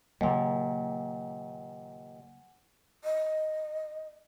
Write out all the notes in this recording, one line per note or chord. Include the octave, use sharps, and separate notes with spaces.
D#2 A#2 C#3 F#3 A#3 F#5 G#5
D#5